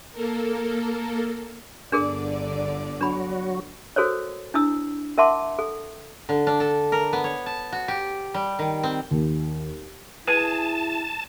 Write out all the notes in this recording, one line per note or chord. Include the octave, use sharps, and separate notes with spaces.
A#3 A4 A#4
G1 D3 D4 G#4 A#4 D5
F#3 D4 F#4 B5
F#4 A4 A#4 C5 C#5
D4 E4 D#6 E6
A#4 E5 F#5 A5 C6 D6
A4
D3
D4
A4
A#4
B3
C#5
A5
F#4
G4
G3
D#3
C4
D#2
E4 G#4 B4 G#5 A5